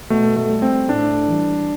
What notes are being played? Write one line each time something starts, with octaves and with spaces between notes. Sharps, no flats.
B2 A3
A3
G3
C4
A2 D4
E3 G3